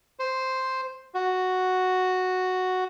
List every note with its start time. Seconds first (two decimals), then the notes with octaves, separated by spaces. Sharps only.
0.19 C5
1.15 F#4